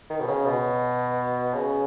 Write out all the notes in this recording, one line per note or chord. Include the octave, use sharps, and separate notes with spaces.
D#3
B2
C#3
B2
C#3